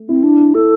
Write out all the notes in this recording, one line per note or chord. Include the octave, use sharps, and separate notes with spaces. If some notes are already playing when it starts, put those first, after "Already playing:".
Already playing: A3
C4 E4
D4 E4
E4
E4 A4